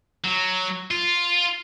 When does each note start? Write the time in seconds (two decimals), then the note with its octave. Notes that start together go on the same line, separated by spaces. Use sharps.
0.24 F#3
0.91 F4